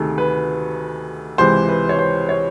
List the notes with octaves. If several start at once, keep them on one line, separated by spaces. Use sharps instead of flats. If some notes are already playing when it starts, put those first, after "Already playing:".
Already playing: D2 C3 D#3 G#4 A4
B4
C#2 C3 E3 C5
B4
C#5
C5
C#5